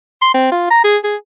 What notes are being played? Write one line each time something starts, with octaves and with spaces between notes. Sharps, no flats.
C6
C4
F4
A#5
G#4
G#4